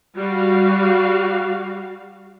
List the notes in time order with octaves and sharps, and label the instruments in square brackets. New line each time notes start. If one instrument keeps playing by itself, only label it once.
[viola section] G3 F#4 F5